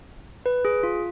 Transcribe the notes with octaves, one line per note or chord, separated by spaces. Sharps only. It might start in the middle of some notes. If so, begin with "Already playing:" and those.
B4
G#4
F4